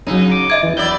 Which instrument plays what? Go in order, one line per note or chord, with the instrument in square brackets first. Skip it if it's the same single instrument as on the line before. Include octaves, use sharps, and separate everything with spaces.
[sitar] C#3 D#4 [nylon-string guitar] F#3 C#4
[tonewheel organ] D6
[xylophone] D#5 E5 G#6
[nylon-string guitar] E2 [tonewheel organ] E3
[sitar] F#3 E4 D5 [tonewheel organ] G6